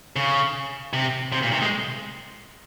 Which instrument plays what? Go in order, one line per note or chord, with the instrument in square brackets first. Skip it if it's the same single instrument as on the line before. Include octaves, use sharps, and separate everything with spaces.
[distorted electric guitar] C#3
C3
C3
A#2
C3
G#3